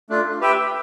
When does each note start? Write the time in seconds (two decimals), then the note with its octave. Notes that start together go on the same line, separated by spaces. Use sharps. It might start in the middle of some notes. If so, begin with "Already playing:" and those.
0.09 A3 D4 F4
0.41 G4 B4 E5 G5